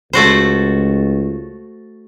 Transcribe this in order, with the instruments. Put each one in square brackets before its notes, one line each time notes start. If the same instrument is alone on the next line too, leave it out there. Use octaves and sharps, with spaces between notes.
[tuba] C#2 [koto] A3 F#4 C5